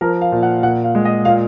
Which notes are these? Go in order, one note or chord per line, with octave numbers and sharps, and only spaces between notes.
F3 A#4
F5
A#2
F#5
A#2 F#5
F5
G#3
D#5
A#2 F5